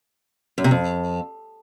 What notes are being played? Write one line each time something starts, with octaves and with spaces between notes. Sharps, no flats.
F#2
C3
F2